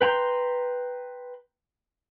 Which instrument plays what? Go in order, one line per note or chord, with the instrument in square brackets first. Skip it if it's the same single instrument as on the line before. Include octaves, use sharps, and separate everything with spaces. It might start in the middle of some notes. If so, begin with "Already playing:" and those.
[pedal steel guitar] B4 G5 A#5 C6 G6